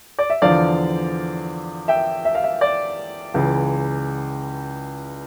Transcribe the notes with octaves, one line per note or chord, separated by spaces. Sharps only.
D5
E5
E2 D3 F3 D5 F5
E5 G5
E5
F5
E5
D5
C#2 C#3 E3